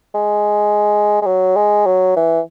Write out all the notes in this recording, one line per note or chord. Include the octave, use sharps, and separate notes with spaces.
G#3
G#3
F#3
G#3
F#3
E3